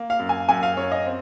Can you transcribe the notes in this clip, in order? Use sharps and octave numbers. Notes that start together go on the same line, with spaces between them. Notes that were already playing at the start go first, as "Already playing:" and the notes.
Already playing: A#3
F5
F#2
G#5
F#2 G#5
F5
F#2 C#5
D#5
C4